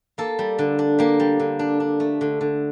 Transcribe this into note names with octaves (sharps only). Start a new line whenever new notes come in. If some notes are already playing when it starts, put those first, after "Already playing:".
A#3 A4
G3
D3
D4
A#3 G4
G3
D3
D4
D4
A3
D3
D3